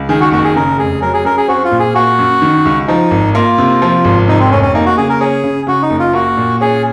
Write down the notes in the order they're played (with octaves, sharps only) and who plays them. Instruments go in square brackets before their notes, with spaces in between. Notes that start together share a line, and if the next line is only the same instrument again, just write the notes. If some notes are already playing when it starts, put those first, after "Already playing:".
Already playing: [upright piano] C#2
[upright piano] D#3 [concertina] G#4
[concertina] F#4
[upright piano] F#1 [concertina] F#4
[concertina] G#4
[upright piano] C#3 [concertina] A#4
[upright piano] F1 [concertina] G#4
[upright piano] F#3 [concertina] A#4
[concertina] G#4
[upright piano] F#2 [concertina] A#4
[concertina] G#4
[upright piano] C4 [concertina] F#4
[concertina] F4
[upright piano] A#2
[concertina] G#4
[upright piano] A#3 [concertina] F#4
[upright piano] F#2
D#3
C#2
[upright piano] F3 [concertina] D#4
[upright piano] G#1
[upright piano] A#3 [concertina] F4
[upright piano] C3
F3
G#1
[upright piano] C3 [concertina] D#4
[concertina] C4
[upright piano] F1 [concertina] C#4
[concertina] C#4
[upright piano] A#3 [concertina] D#4
[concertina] F#4
[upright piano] C#3 [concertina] G#4
[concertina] A#4
[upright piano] C#4 [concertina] G#4
[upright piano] C#3
[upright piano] C#3 [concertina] F#4
[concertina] D#4
[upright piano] F#1
[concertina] F4
[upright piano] A#3 [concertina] F#4
[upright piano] A#2
[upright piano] C#4 [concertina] G#4